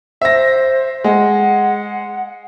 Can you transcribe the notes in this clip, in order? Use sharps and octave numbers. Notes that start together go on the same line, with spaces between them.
C5 E5 A#6
G#3 F#5